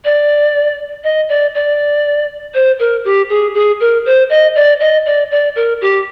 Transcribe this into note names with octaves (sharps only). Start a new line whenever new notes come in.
D5
D#5
D5
D5
C5
A#4
G4
G#4
G#4
A#4
C5
D#5
D5
D#5
D5
D5
A#4
G4